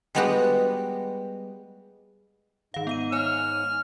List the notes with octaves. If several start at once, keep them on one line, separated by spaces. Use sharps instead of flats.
G3 G#3 B3 F#4 G4 B4
G#2 D#3 F5
B3 F5 D#7
C#5 G#5 F6